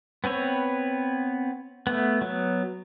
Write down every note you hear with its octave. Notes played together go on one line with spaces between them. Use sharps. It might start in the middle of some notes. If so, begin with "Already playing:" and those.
B3 C4 B4 C#5
A3 B3
F#3 B3